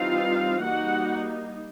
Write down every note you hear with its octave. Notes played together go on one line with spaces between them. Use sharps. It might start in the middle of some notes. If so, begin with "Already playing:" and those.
Already playing: E3 G3 C4 D#4 F4 F5
G3 A#3 D#4 F#4 F#5